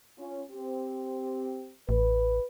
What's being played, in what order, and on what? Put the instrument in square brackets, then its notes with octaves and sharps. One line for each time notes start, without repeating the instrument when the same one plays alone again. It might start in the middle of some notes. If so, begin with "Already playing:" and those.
[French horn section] C#4 F4
C4 G4
[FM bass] A1 [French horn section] B4